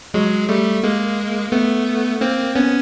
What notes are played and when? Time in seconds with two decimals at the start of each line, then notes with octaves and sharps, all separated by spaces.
0.14 F#3 G#3
0.49 G3 A3
0.84 G#3 A#3
1.52 A3 B3
2.21 A#3 C4
2.56 B3 C#4